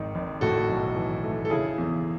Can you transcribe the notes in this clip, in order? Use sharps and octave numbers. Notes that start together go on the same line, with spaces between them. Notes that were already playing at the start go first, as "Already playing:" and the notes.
Already playing: G#1 G#2 D#3
G#1
A2 F#4 A4
B1
E3
A3
A4
C#3 E4 G#4
E2